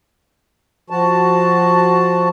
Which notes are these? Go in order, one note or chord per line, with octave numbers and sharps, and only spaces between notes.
F3 F#4 A5